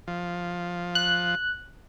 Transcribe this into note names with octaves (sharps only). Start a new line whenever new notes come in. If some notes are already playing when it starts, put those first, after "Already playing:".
F3
F#6